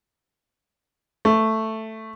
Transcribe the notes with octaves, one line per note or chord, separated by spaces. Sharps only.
A3